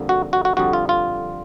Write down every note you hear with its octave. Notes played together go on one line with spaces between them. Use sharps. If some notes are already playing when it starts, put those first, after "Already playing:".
Already playing: F2 D3 G3 A#3
F#4
F#4
F#4
F2 D3 G3 F#4
F4
F4